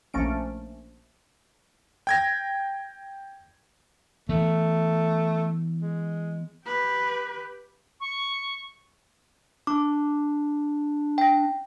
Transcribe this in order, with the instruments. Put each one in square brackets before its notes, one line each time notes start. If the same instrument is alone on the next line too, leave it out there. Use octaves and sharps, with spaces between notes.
[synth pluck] A#1 F3 A3 A#3 C#4 D7
[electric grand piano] G5 G#6 A#6
[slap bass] E3 B3 [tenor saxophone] A3
[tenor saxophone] G#3
[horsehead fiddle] G4 B4
[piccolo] C#6
[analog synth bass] D4 [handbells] D6
[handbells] G5 A#6